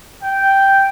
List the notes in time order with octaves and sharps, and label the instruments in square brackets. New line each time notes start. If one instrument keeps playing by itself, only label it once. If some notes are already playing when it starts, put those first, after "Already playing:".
[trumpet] G5